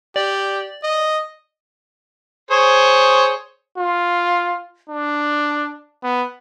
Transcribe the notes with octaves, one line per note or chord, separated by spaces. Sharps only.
G4 D5
D#5
G#4 C5 C#5
F4
D4
B3